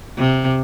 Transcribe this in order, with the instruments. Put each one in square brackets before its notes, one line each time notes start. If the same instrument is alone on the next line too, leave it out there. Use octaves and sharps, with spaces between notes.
[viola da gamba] C3